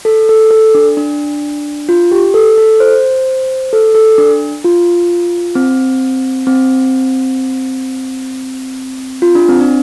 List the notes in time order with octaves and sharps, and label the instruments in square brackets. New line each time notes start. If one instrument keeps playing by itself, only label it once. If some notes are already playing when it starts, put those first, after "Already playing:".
[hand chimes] A4
A4
A4
D4
D4
F4
G4
A4
A4
C5
A4
A4
D4
F4
C4
C4
F4
D4
C4
D4